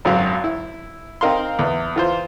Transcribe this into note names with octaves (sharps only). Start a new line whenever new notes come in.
G#1 F#2 F#3 F5
E4
C4 D#4 A#4 F5 C6
E2 B3
E3 F4 C5